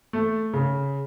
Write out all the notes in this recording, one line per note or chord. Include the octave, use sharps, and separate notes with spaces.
A3
C#3